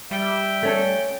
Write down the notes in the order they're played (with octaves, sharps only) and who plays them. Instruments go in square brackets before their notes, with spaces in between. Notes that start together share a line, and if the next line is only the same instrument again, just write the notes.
[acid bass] G3 [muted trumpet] E5 [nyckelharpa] G5
[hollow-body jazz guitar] A3 C#4 A4